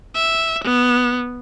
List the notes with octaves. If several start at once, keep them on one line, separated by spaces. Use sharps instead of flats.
E5
B3